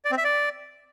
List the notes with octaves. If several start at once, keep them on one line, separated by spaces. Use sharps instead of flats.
D5
C4
E5
D5